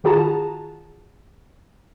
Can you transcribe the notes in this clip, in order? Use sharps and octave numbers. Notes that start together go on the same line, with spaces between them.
D#3 F4 F#4 G#4 A5 A#5